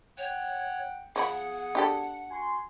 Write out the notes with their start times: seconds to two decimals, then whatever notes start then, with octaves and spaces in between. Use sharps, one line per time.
0.18 C#5 F#5 G5
1.16 F3 B3 G#4 C#5 F#5 B5
1.75 D4 G4 A4
2.30 F#4 G#5 C6